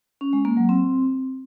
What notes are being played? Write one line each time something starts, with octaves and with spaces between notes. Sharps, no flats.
C#4
G#3
A#3
F#3
C4